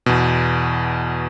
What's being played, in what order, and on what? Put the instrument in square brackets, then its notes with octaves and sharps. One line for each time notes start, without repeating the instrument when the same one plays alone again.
[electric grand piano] E2 B2